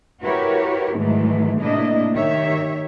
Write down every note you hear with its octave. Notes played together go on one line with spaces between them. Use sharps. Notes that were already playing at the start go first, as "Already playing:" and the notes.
E4 F#4 G4 A#4 B4 C#5
G#2 D#3 E3 F#3 G#3 A3
A2 C3 A#3 D4 E4 D#5
D#3 G4 C#5 E5